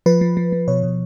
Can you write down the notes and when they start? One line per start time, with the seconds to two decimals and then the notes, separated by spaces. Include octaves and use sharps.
0.06 F3 B4
0.21 F3
0.37 F3
0.52 F3
0.68 B2 C#5
0.83 B2